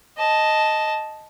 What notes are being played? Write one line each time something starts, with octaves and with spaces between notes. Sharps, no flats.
D#5 A5